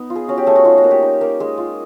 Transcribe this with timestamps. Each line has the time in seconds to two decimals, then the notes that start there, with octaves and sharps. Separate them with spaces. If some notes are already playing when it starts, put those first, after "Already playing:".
Already playing: B3 D#4
0.10 F4
0.15 G#4
0.28 C#4 F#4
0.37 G4
0.47 A3 G#4
0.56 F#4
0.65 D#4 F4
0.78 F#4
0.84 A#3
0.91 G4
1.02 D#4
1.21 A#3
1.40 G#3 G#4
1.58 F4